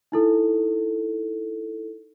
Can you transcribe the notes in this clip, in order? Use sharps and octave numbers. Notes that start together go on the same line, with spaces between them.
D#4 E4 A4